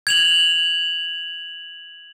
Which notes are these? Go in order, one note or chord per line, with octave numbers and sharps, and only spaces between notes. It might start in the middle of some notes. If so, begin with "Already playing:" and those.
G#6 F7 F#7